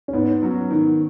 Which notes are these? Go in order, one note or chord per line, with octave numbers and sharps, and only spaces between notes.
C#4
G#2 B3
F#3 C#4 F#4
D#3